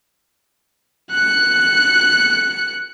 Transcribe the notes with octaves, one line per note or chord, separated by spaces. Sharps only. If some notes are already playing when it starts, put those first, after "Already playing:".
F#6 C#7